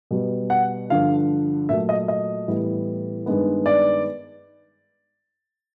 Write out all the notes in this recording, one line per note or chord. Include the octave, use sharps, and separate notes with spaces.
B2 G3 B3
F#5
G2 D3 F3 F5
A#2 F#3 A3 E5
D#5
D#5
A2 E3 G3 B3
G2 D#3 G#3 B3
D5